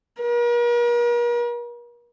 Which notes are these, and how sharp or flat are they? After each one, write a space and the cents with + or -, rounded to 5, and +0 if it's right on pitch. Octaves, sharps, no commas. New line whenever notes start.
A#4 +45